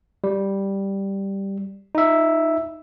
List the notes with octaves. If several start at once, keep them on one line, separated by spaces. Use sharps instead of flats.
G3
D#4 E5